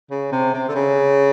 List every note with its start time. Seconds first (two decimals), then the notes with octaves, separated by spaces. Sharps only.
0.11 C#3
0.32 C3
0.54 C3
0.69 D3
0.75 C#3